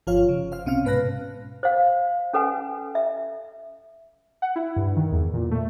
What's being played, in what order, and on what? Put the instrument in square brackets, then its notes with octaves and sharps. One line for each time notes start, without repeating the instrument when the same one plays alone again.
[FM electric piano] G1 F3 F4 C#5 F5
C#3
C5 F5 F6
C2 C3 C#4 F5 F6
G#2 B2 B4 A5 F#6 A#6
[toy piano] C5 F5
C#4 A4 B4 F#5 G#5
E5
[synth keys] F#5
E4
G2
D#3
E2
A#2
A3